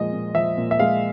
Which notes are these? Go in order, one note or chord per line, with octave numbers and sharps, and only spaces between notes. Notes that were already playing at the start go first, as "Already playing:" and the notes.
Already playing: A#2 F3 G#3 D#5
A#2
F3 E5
A#2
E5
G#3 F5